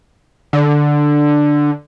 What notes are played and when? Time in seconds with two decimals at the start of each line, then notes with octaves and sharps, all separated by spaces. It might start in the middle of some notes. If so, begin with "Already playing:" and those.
0.53 D3